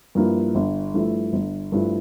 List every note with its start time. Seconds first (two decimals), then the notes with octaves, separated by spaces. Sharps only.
0.15 G2 F3 A#3 E4
0.55 G1
0.94 G2 F3 A3 E4
1.33 G1
1.72 G2 F3 A3 E4